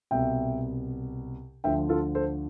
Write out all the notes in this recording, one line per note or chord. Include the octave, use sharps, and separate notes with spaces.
C2 B2 E5 G5
D2 D3 F3 E5 G5
F4 A4
A4 C5